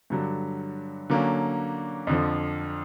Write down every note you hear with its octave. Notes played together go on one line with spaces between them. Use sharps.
G2 D3 F#3
D3 F#3 A#3 C#4
F2 D3 F3